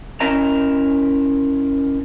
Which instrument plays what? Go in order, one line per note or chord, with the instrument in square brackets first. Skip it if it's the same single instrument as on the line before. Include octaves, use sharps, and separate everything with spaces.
[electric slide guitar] C#4 E4 A#4 D#5 A#5